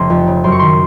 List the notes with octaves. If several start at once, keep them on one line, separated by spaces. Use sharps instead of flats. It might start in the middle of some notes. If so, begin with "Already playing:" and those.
Already playing: F1 C#3 C6
F2
C#3
F#2 C6
C#6
D#3 C6